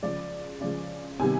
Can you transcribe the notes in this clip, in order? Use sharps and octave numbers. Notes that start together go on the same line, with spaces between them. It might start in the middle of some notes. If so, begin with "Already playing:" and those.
C#3 F3 G#3 D5
C#3 F3 G#3 D5
C3 D#3 G3 B3 G#5